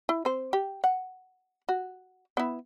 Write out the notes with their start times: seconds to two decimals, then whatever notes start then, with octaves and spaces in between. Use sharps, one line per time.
0.09 E4
0.25 C4 C5
0.53 G4
0.84 F#5
1.69 F#4
2.37 B3 E4